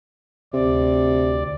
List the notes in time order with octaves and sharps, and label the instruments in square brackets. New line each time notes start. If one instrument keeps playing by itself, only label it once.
[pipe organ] D2 D5 [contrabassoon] C3